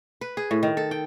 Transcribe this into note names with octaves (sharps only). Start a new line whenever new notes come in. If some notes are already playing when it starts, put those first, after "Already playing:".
B4
G#4
A2
D#3
A4
G5